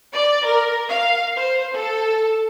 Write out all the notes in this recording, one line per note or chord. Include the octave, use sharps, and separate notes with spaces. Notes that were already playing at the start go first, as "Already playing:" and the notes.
D5
A#4
F5
C5
A4